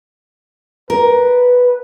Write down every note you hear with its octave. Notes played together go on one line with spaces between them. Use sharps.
A#4 B4